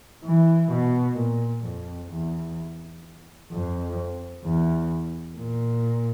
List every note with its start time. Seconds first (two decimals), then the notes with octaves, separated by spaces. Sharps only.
0.24 E3
0.72 B2
1.18 A#2
1.65 F2
2.11 E2
3.52 F2
4.44 E2
5.37 A#2